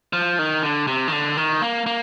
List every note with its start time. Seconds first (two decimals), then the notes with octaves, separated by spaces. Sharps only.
0.13 F3
0.39 D#3
0.63 D3
0.87 C3
1.08 D#3
1.12 D3
1.37 D#3
1.62 A#3
1.86 A#3